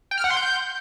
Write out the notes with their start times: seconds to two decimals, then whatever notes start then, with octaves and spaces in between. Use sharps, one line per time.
0.11 G5
0.18 F6
0.24 F#5
0.30 C6
0.37 G6